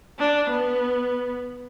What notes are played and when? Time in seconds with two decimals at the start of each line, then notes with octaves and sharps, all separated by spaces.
0.19 D4
0.49 B3